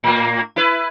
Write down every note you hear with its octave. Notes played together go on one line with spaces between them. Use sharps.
A2 A#3
E4 B4